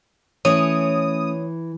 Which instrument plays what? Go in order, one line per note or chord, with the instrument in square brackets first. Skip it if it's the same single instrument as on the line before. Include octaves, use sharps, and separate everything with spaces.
[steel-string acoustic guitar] E3 [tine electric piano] A3 C#4 [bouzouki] C#5 [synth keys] D#6